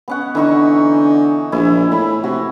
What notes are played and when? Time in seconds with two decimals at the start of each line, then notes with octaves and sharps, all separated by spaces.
0.08 B3 C#4 F#5
0.35 D3 E3 D#4 C#6
1.52 A#1 E4
1.92 A2 B5
2.24 C3 F#4